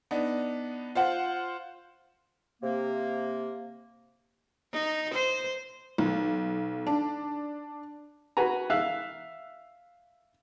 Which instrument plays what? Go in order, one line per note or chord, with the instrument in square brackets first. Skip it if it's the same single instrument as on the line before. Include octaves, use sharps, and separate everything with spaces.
[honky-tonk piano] B3 D4 D#4
F4 C5 F#5
[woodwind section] C3 A#3
[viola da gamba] D#4
C5
[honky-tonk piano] B1
D4
[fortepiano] F#4 B4 G#5 A#5
E5 F5 E6 F#6